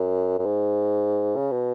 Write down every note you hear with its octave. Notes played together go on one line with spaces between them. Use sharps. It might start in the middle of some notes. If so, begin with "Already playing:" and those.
Already playing: F#2
F#2
G#2
C#3
B2